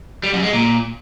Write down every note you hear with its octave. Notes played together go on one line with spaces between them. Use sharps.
G3
F#2
G#3
A#2